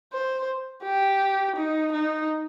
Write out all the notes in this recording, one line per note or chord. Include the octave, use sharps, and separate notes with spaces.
C5
G4
D#4
D#4